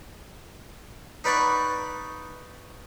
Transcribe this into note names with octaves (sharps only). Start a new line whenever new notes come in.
D#4 B4 D5 F#5 C#6